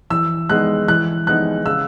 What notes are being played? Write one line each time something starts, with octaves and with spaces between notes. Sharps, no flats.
E3 E6
G#3 B3 D#4 F#6
E3 F#6
G#3 B3 D#4 F#6
C#3 E6